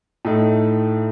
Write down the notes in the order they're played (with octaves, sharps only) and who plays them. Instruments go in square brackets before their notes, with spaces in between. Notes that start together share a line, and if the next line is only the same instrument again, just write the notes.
[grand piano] A2 A3 D#4